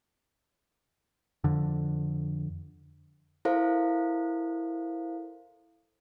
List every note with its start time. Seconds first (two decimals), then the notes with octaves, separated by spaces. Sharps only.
1.44 F2 D3
3.45 E4 A4 A#4 C5 F5